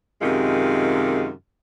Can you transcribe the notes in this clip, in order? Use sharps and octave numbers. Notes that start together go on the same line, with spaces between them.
F#2 C3 D#3 G#3 F4 G4